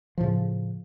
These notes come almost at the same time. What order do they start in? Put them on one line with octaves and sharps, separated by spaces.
F3 A2 C#3